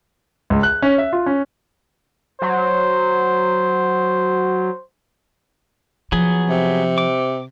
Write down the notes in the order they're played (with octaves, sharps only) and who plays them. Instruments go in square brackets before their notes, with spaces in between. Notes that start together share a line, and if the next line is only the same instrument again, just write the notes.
[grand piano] C#2
F#6
C#4
E5
F4
C#4
[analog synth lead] F#3 [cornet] C5
[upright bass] F3 [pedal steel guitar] F#3 B3 G#4
[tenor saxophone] C3
[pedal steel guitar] D6